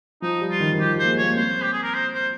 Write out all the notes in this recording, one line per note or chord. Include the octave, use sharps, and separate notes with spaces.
F3 D#4
G3
F4
D#3
D#3
F3 G4
G3
A#3 C5
G#3
A#3 C#5
C4 C5
G4
G#4
A#4
C5
C5